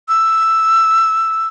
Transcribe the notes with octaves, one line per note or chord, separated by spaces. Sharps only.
E6